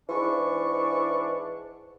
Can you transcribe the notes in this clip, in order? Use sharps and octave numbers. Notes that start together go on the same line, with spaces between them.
G#2 E3 D4 C#6